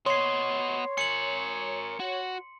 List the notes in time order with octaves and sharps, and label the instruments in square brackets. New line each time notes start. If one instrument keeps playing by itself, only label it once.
[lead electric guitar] B3 D#5 [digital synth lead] C#5 [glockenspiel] C6 C7
[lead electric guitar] A#4 G#5 [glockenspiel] C#7 F#7
[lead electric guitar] F#4